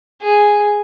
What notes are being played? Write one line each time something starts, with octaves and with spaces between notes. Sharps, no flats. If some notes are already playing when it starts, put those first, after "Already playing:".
G#4